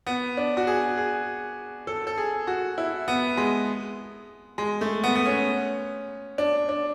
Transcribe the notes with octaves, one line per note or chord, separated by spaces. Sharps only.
B3
D4
F#4
G#4
G#4
A4
A4
G#4
F#4
E4
B3
G#3
G#3
A3
B3
B3
C#4
D4
D4